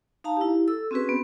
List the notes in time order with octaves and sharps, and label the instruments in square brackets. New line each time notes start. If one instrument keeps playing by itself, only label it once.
[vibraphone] D#4 F5 A5 A#5
E4 G4
A4 E6
C4 C#4 F#4 G#4 B4
B3 C4